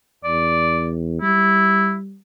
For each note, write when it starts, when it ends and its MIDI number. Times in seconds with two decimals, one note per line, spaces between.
0.24 1.21 40
0.24 0.91 74
1.22 2.18 55
1.22 1.93 64